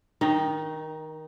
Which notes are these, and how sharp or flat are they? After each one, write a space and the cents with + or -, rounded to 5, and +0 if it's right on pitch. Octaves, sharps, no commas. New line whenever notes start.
D#3 +15 D#4 -10